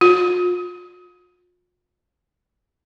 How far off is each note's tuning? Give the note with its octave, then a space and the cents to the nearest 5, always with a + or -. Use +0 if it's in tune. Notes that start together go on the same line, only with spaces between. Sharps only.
F4 +40